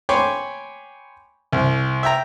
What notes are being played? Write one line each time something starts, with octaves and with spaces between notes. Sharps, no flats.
C#5 G5 G#5 B5 C6 D6
C2
E5 G5 A#5